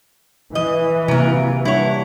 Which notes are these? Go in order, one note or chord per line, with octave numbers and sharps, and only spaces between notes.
E3 D#5
C3 F#3 A#3 A#4
G3 D4 E4 C#5 F#5